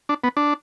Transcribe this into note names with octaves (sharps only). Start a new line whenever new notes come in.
D4
B3
D4